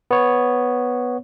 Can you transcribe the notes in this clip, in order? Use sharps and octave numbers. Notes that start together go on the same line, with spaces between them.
B3 C#5